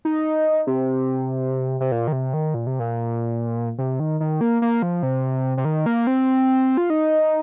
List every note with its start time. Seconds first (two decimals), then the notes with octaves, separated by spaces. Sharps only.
0.05 D#4
0.67 C3
1.80 C3
1.92 A#2
2.08 D#3
2.12 C3
2.33 D#3
2.54 A#2
2.67 C3
2.79 A#2
3.78 C3
4.00 D#3
4.20 D#3
4.41 A#3
4.62 A#3
4.82 F3
5.03 C3
5.57 C3
5.65 D#3
5.86 A#3
6.07 C4
6.77 F4
6.90 D#4